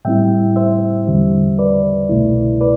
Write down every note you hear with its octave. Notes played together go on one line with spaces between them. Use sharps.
A2 G3 C4 E4 E5 G5
C5 E5
E2 D3 G3
B4 D5
C2 B2 A3 E4
B4 D5